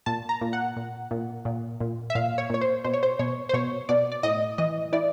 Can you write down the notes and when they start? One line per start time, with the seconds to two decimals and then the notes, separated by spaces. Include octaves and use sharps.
0.06 A#2 A5
0.29 A#5
0.41 A#2
0.53 F#5
0.77 A#2
1.11 A#2
1.45 A#2
1.81 A#2
2.10 E5
2.15 A#2 F5
2.38 C#5
2.50 A#2 C#5
2.61 C5
2.84 B2 C5
2.93 C#5
3.03 C5
3.19 B2 C#5
3.49 C5
3.54 B2 C#5
3.89 B2 D5
4.12 D5
4.23 A2 D#5
4.58 E3 D#5
4.93 E3 D5